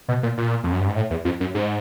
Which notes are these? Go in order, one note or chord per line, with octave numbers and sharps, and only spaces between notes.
B2
A#2
A#2
F2
F#2
G2
G#2
A2
E2
F2
F#2
G#2